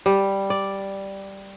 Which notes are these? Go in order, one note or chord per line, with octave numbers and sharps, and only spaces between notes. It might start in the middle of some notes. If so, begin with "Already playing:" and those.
G3
D5